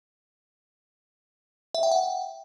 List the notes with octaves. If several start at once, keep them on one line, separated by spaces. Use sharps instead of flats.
E5
G5
F#5